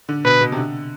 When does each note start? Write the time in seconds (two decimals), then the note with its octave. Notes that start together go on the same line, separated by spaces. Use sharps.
0.09 D3
0.24 B2 B4
0.41 B2
0.52 C3
0.57 D3